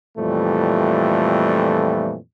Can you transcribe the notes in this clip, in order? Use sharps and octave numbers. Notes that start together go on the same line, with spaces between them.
F2 A#2 E3 G3 A3